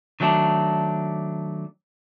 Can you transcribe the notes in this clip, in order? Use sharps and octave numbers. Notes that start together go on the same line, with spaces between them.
D#3 F#3 A3 C#4 D4